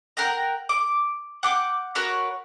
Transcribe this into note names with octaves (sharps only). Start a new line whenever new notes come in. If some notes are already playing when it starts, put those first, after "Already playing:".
A#4 F#5 G5 A#5
D6
F#5 D6 G6
F#4 A#4 B4 C#5